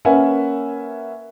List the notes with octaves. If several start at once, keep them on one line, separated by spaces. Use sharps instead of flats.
A#3 C#4 B4 E5 F#5 G#5